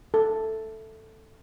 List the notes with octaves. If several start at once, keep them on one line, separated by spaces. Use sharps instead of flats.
A4